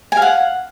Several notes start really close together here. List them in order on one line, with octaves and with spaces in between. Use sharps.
G#5 F5 F#5